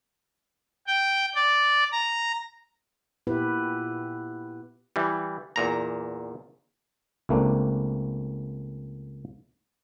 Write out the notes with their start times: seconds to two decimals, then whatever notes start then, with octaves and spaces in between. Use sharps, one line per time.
0.87 G5
1.36 D5
1.92 A#5
3.27 A#2 B3 E4 G4 B4
4.96 E3 G3
5.56 E2 A#2 A#5
7.29 C#2 A3 A#3 C4 D4